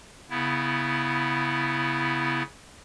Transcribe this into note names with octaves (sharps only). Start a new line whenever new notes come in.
C#3 B3 E4